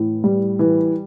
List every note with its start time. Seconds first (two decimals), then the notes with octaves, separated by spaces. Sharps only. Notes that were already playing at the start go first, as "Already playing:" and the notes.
Already playing: A2 E3
0.24 G3
0.59 E3